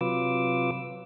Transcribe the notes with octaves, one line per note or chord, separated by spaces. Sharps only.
C3 F#3 F4 B4 D6 E6